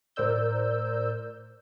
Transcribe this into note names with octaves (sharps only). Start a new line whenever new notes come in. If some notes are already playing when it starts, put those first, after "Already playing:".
A2 A#4 C5 D5 E6 G6